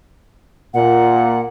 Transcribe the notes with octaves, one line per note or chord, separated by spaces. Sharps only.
A#2 F#5